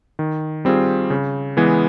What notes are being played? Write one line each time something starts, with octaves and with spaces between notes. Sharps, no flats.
D#3
G3 C4 F4 G#4
C#3
E3 G#3 B3